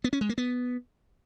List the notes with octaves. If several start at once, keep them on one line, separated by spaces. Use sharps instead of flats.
B3
C#4
G#3
A#3
B3